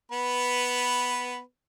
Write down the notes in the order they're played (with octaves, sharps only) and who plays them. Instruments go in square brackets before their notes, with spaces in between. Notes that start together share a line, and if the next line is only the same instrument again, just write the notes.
[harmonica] B3 B4